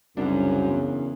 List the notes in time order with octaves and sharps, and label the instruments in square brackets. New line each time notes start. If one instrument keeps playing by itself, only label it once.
[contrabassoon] C2 [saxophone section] F#2 [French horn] C#3 [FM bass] D4
[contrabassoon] E2